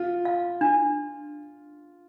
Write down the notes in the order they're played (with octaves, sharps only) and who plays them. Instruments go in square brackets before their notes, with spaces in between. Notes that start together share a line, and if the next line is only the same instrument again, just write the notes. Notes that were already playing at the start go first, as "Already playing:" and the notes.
Already playing: [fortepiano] F4
[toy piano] F5
D4